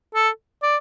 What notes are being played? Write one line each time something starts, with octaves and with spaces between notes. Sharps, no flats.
A4
D5